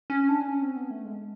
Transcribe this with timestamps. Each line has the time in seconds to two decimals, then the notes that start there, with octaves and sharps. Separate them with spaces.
0.10 C#4
0.29 D4
0.48 C#4
0.62 C4
0.76 B3
0.91 A3
1.05 G#3